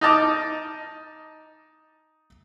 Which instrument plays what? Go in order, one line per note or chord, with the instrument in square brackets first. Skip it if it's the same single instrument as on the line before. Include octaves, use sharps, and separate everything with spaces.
[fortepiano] D#4 D#5 A5 D6